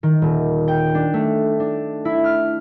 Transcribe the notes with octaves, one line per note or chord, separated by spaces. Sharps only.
D#3
D#1
G5
D4
A3
D4
E4
F6